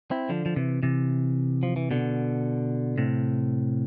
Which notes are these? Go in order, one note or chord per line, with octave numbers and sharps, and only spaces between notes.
C4 E4
D3 F3
F3
C3 E3
C3 E3
F3
E3
B2 D3
A2 C3